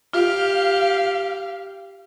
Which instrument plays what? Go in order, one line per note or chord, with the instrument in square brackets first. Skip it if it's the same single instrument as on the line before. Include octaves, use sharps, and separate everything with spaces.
[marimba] F4 [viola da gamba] G4 [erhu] F5